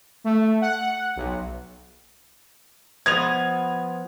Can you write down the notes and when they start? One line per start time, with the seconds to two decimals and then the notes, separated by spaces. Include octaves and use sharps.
0.24 A3
0.61 F#5
1.16 B1
3.06 F3 B3 D#5 G#6 F7